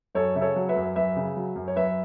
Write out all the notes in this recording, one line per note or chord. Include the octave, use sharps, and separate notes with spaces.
F#2 A4 C#5
C#3 E5
A4 C#5
F#3
B4 E5
F#2
F#2 B4 E5
C#3
F#3
F#2
C#5
F#2 B4 E5